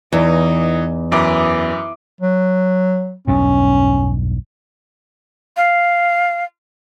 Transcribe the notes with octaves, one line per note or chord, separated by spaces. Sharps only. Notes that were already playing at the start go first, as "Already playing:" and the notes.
E2 E3 D#4
F#2 E3 D6 D#6
F#3
B1 E2 G2 C#4
F5